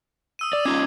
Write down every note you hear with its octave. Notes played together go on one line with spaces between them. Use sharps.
D#6 E6 D#7
D5 D6
C#4 D#4 F4 D6 G#6 C7